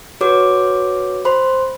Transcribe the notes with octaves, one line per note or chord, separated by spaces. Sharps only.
F#4 B4 C#5 D6
C5 B5 C6